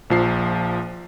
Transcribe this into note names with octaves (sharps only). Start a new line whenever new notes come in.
A#1 F3 C7